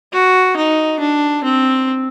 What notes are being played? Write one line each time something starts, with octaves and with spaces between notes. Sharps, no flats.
F#4
D#4
D4
C4